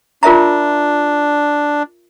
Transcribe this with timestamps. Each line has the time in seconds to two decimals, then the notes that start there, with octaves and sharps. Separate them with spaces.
0.23 D4 F4 A#4 E5 A#5